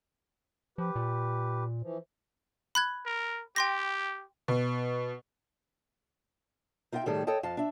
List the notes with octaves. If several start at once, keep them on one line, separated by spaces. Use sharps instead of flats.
F3 G4 B4
A#2
E3 F3
B5 F#6 G#6
A#4
G4 G5 C6 A#6
B2
D#4 F4 E5 F#5 G5
A2 D#3 G3 A3 G#4 A4
A4 C#5 D#5 G5 A5
F2 F5 A5
D4 E5